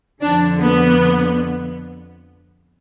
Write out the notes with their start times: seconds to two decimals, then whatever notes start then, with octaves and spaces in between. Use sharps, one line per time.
0.21 F2 D3 F3 D4
0.62 B3